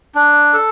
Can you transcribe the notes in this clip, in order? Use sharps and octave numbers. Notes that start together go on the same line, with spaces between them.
D4
A4